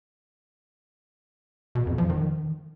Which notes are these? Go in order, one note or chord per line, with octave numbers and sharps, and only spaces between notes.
B2
F2
F3
D#3